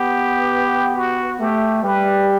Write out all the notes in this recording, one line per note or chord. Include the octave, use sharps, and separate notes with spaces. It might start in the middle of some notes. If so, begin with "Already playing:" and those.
Already playing: B3 G4
F#4
A3 G4
G3 B4